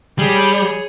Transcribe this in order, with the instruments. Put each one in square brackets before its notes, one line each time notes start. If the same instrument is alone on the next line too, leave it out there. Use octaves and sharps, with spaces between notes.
[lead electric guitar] G3 [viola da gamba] G#4 C#5